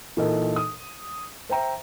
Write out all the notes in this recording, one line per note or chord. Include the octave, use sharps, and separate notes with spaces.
A#2 E3 D#4 A4 A#4 D#5
D#6
C5 E5 G5 A#5